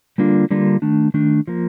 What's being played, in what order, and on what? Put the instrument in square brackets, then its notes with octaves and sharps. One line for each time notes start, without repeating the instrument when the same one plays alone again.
[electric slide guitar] D3 G3 A#3 D4 F4
D3 G3 A#3 D4 F4
D#3 A3 D4
D#3 A3 D4
F3 A#3